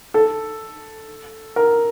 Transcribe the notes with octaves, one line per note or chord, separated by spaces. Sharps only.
A4
A#4